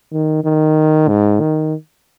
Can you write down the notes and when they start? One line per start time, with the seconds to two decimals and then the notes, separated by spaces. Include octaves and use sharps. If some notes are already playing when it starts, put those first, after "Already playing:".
0.12 D#3
0.44 D#3
1.08 G#2
1.40 D#3